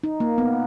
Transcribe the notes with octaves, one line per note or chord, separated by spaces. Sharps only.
D#4
A#3
B3